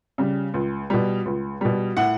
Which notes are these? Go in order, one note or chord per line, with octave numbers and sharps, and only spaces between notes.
C#3 G3
C#2
B2 G3
C#2
B2 G3
A2 F#5